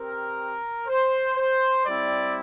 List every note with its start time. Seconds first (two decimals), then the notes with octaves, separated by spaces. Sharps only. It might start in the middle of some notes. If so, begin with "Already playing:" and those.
Already playing: C4 G4 A#4
0.88 C5
1.37 C5
1.86 G3 C4 E4 D5